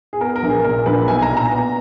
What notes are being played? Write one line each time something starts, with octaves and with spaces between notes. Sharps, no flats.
G#4
B3 A#4
A#4
A#1
G#4
A#2 A#4
A#1 B4
B1 G#5
A#5
A#2
A#5
B3